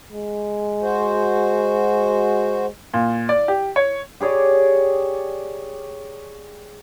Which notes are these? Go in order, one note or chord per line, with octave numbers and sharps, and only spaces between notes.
G#3
F#4 C5
A#2
D5
G4
C#5
G4 G#4 C#5 D5